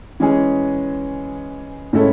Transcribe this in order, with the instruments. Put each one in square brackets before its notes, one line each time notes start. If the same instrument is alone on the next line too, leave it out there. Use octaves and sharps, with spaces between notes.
[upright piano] E3 G#3 C#4 G#4
A2 G#3 C#4 E4 A4